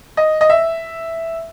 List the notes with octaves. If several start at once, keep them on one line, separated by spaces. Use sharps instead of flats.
D#5
D#5
E5